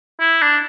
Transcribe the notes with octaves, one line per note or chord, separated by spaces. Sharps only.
E4
D4